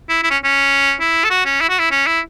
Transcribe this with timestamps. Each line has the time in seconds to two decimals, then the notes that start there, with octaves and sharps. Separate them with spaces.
0.09 E4
0.23 E4
0.30 C#4
0.44 C#4
1.00 E4
1.24 A4
1.30 F#4
1.45 C#4
1.61 E4
1.69 F#4
1.79 E4
1.91 C#4
2.06 E4